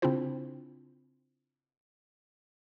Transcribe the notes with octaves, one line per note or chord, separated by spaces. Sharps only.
C#3 C4 D4 E4 F4 C5